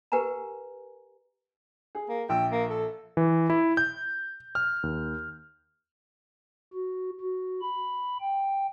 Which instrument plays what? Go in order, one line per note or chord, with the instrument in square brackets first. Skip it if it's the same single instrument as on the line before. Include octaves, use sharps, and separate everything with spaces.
[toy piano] G4 A#4 B4 F#5 G#5 A#5
[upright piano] G#4
[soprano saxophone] A#3
[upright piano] A#1 E6 [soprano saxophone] G5
[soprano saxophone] A#3
A4
[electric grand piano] E3
E4
G6
F6
D#2
[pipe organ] F#4
F#4
B5
G5